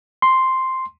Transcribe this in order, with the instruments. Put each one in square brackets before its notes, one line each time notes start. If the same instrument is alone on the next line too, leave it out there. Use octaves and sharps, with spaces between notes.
[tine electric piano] C6